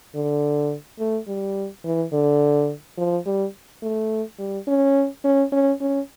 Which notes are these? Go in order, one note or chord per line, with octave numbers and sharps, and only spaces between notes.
D3
A3
G3
E3
D3
F3
G3
A3
G3
C#4
C#4
C#4
C#4